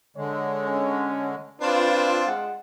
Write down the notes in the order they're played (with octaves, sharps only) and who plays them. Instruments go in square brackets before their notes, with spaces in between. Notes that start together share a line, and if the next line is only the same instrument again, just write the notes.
[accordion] D3 G#3 [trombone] C#5
[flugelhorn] C#4
[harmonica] C4 D4 [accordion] F4 [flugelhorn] B4
[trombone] G#3 [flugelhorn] F#5